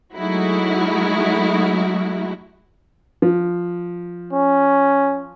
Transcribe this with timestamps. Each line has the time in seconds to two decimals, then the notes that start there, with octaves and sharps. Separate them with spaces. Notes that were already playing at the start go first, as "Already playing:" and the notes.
0.16 F#3 G#3 A3 D#4 E4 F#4
3.22 F3
4.33 C#4